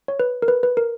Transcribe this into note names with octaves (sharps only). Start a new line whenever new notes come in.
C#5
B4
A#4
B4
B4
A#4